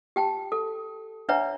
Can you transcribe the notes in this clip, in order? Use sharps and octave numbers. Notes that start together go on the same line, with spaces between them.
G4 G5 A5
A4
D4 B4 C#5 E5 F#5 A#5